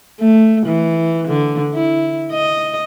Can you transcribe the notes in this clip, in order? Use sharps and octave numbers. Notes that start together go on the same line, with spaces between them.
A3
E3
D3
E4
D#5